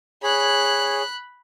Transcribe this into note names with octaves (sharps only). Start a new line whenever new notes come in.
G#4 C#5 B5 F#6